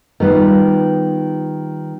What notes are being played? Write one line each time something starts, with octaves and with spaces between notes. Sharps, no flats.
D#3 G3 B3 F4